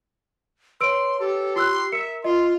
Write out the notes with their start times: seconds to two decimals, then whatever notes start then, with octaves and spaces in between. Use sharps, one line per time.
0.81 B4 C#5 C6 E6 D7
1.20 G4 A4
1.56 F4 C6 E6 F#6
1.92 A#4 E5 C#7
2.24 F4 D#5 C6